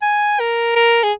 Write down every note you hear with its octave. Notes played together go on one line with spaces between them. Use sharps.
G#5
A#4
A#4
G#4